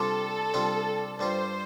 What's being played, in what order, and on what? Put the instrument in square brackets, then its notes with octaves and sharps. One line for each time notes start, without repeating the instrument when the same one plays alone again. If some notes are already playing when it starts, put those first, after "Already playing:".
Already playing: [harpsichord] C3 G3 D4 F4 [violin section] A4
[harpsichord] C3 G3 D4 F4
[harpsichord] G2 G3 F4 [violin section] C5